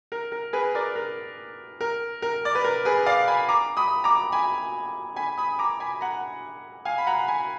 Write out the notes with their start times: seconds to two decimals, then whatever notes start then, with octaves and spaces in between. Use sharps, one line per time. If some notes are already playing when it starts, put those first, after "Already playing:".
0.12 A#4
0.32 A#4
0.53 G#4 B4
0.75 A#4 D5
0.96 A#4
1.81 A#4
2.22 A#4
2.45 D5
2.55 B4
2.64 A#4
2.85 G#4 B4
3.06 D5 F5
3.28 G#5 B5
3.49 A#5 D6
3.77 B5 D#6
4.04 A#5 D6
4.32 G#5 B5
5.16 G#5 B5
5.38 B5 D#6
5.59 A#5 D6
5.80 G#5 B5
6.01 F#5 A#5
6.85 F5 G#5
6.98 B5
7.07 F#5 A#5
7.27 G#5 B5